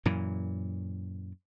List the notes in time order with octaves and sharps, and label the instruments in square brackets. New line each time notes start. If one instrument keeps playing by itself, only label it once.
[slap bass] F#2 A#2 E3